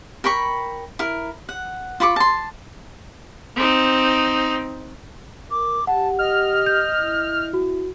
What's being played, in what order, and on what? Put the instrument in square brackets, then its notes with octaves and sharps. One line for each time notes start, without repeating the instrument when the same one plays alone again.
[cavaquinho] A#4 G5 B5 C#6
E4 A#4
F#5
F4 B5 C#6 D6
A5 C6
[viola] C4 D#4
[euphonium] A#4 [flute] D6
[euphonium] G4 [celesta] F#5 [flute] A5
[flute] D#5 [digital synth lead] F6
[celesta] G6
[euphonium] E4
[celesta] F#4